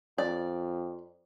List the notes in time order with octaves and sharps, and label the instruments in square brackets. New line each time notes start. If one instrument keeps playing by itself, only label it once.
[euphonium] F2 [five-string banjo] D5